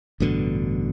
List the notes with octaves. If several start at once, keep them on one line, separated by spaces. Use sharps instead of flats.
A1 G2 B2 D3